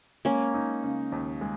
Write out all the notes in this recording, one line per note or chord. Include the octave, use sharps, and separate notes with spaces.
G#3 A#3 C#4
D#4
C#3
D#2
G#3